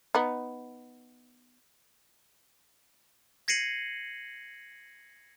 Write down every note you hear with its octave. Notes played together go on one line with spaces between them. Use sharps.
B3 D#4
G#6 A#6 C7 C#7 D#7 F#7